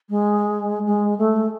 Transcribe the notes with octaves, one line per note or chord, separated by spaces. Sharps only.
G#3
G#3
A3